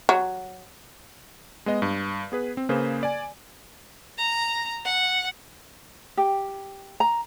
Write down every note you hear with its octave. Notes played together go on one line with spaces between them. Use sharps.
F#3
G#3 B3 D#5
G2
B3 G#4 B4
C4
C#3 A#3 G#4 B4 C5
D5 G#5
A#5
F#5
G4
A#5